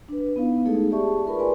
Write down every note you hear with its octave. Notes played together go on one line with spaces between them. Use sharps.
D4 B4
B3 D#4 E4 F5
G#3 A3 D#4 E4 G#4 A4
G4 G#4 D5 E5 A5 C#6
F4 A#4 B4 B5 C#6
G#4 B4 D5 G#5 C6